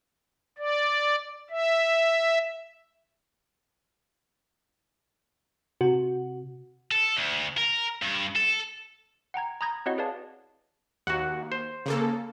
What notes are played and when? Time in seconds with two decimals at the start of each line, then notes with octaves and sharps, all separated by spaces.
0.58 D5
1.50 E5
5.81 C3 F#4
6.91 A4
7.17 D2
7.58 A#4
8.02 G2
8.36 A4
9.34 F#5 G5 A#5 G#6
9.61 A#5 B5 D#6 G6 G#6 A#6
9.86 C4 E4 F#4 C#5 D#5 F#5
9.98 G#4 B4 C#5 D5 F5 A5
11.07 D#2 F#4 F#5
11.52 C5
11.86 C#3 A#3 A4